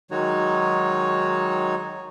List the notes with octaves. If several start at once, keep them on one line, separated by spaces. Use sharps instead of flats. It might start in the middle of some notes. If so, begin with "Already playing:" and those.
D#3 F#3 G#3 D#4 F#4 C#5